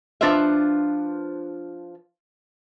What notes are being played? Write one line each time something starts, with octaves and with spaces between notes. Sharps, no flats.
F3 D4 F4 B4 C5 E5